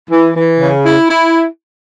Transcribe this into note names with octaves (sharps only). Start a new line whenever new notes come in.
E3
E3
C#3
E4
E4